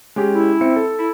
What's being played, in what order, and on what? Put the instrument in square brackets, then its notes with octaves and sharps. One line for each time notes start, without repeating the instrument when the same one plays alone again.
[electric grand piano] G#3 C#4 G4
[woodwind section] E4
[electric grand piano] C4 E5 C#7
A4
[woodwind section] E4